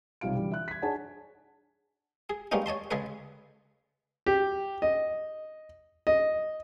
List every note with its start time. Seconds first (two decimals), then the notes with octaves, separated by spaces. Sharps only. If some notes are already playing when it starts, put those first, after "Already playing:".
0.21 B1 C3 G3 F4 F5 D7
0.35 D3 E3 G3
0.52 E5 F#6
0.68 G#6 B6
0.82 D4 G#4 C#5 F#5 G#5 A5
2.30 G#4
2.52 G3 G#3 A#3 B3 C#4 D#4
2.66 C#5 D#5 A5 C6
2.91 C#3 G#3 G#4 A4 B4
4.26 G4
4.82 D#5
6.07 D#5